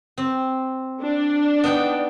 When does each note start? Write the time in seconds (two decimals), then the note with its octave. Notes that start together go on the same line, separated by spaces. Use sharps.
0.18 C4
1.01 D4
1.64 B3 D#4 G5